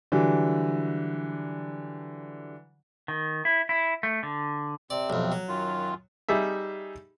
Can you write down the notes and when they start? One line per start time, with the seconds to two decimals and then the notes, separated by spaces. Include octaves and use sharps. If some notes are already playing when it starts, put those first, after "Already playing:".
0.12 D3 E3 F#3 G3
3.08 D#3
3.45 E4
3.69 E4
4.03 A3
4.23 D3
4.90 C3 C4 D5
5.10 B1 F2
5.32 F#3
5.49 F#2 D#3 F4
6.29 G3 D#4 G#4 E5